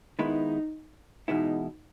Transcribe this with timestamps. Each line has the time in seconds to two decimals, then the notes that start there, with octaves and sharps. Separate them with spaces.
0.19 D#3 G#3 B3 D#4 E4 B4
1.28 E2 B2 G#3 B3 D#4 E4